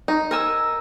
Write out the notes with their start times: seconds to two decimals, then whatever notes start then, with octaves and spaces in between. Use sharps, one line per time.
0.08 D#4
0.31 A#4 G#5 E6